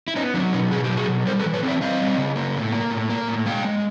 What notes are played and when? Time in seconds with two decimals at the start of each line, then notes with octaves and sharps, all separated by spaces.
0.08 E4
0.16 B3 C#4 D#4
0.34 F#3 C4 D4
0.53 B2 C#4 D#4
0.71 B2 G#4
0.84 G4
0.90 F#3
0.97 F#4 G#4
1.08 B2
1.26 G3 A#4 C5
1.40 A4 B4
1.45 E3
1.54 B4 C#5
1.63 C4
1.68 D5 E5
1.81 C4 D#5 F5
2.00 G3
2.18 C#3
2.36 A#3
2.55 A2
2.72 A#3
2.91 A2
3.09 A#3
3.28 A2
3.46 G#3 F5 G5
3.65 G#3